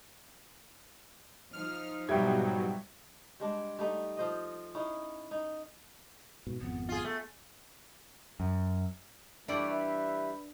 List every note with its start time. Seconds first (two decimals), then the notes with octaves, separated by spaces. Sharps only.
1.53 F3 D#4 F6
2.09 G#2 B2 F#3 G3 G4 E5 G5 G#6
3.40 G3 G#3 D4
3.79 G3 A3 D#4
4.17 F3 C5 D#5
4.75 C#4 D#4 E4 G#4
5.31 D#4
6.47 G#2 B2
6.61 G#1 F2 B3
6.89 F4 G#4
7.05 A3
8.40 F#2
9.48 E3 G3 A3 D4 D5
9.69 B4 E5